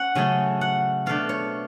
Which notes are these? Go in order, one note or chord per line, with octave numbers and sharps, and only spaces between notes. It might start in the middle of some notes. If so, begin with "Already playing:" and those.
Already playing: C#4 F#5
C#3 F#3 A3 G#5
F#5
B2 A3 D4 F5
C#5